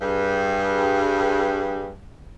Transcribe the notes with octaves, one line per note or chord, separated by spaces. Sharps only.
G2 G#4